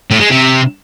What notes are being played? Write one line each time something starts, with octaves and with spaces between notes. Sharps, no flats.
A2
G#3
C3